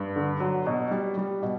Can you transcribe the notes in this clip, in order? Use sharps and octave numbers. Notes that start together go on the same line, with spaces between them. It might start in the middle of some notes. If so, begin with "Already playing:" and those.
Already playing: G2
D3
F#3
B2
G3
G3
B2